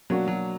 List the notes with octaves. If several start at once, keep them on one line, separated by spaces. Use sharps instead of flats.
B2 F#3 A#3 D4 F#4
F#3